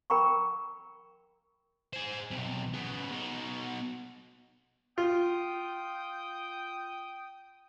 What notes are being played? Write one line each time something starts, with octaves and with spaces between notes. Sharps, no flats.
A#4 G5 A#5 B5 C#6
G#4 C5
B1 C3
C#3 B3
B2 D#4
F4 G5 D#6